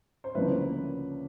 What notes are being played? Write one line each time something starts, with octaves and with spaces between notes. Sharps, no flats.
C5
D2 C#3 F3 A#3 D4 B4